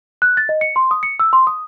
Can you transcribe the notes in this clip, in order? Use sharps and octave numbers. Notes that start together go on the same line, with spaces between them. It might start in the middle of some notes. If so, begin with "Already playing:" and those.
F#6
A6
D#5
C#7
C6
D#6
C#7
E6
C6
D#6